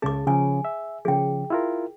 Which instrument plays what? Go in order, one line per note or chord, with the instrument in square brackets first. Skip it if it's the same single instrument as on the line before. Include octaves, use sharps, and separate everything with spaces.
[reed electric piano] C#2 C#3 A5 [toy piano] G#4 D6
[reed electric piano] C#3 F3 [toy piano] G#5
[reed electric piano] E5
[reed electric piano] C#3 F3 [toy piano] G#4 G5
[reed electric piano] E4 F4 A#4